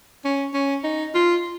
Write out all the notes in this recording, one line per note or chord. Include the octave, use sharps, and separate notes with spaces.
C#4
C#4
D#4
F4